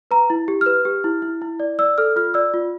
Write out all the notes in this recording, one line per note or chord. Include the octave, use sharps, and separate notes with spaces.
B4 A#5
E4
G4
F6
B4
G4
E4
E4
E4
D5
D5 E6
A4 F6
F4 F6
D5 E6
F4